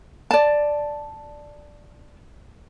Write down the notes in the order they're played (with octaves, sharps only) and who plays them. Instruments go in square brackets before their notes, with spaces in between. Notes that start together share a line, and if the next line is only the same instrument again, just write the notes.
[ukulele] D5 A5